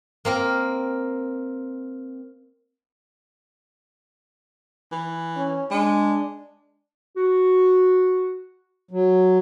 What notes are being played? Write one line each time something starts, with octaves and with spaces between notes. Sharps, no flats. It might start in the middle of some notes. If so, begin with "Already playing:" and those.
A#3 C4 A#4
E3
C#4
G#3 D4
F#4
F#3